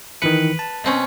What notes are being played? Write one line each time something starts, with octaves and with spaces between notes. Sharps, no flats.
D#3 E3 B4 C#7
A5
B2 C4 C#4